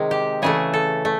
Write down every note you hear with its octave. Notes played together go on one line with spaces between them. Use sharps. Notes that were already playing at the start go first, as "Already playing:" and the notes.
Already playing: C3 D#3 G#3
G4
C#3 E3 A3 G#4
A4
A3